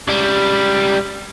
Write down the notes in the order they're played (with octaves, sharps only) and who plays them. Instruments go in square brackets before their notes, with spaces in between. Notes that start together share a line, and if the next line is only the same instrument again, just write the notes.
[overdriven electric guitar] C#2 G3